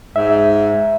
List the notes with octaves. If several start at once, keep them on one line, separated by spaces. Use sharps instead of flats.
G#2 E5